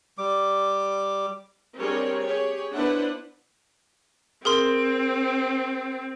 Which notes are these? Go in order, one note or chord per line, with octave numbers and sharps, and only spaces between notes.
G3 D6
G3 C4 D4 G#4 A#4 C#5
G4 G#4 C#5
B3 D4 E4 B4 C5 F#5
C4 G#4 A#4 C6